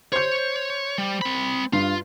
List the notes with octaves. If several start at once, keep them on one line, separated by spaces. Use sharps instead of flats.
C5 C#5 G6
G3
C4 B5
G2 F4